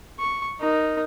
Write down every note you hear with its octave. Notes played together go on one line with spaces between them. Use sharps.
C#6
D#4 A#4